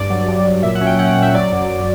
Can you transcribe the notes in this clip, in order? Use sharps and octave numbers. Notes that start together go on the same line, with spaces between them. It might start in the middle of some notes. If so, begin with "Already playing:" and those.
Already playing: G2 D5
F#3
G2
F#3
A#2 E5
F#5
C#4
G5
C#4 F#5
F#5
A#2
E5
F#3 D5
F#2
F#2 D5